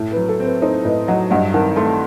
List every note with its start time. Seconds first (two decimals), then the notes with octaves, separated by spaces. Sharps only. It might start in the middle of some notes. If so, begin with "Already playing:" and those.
Already playing: A2
0.11 B4
0.17 F#3
0.29 A4
0.40 C4
0.45 B4
0.62 D#4 A4 C5
0.85 A2 B4 D#5
1.07 F#3 D#5 F#5
1.31 G2 D#5 F#5
1.54 D#3 F#5 A5
1.76 A3 A5 C6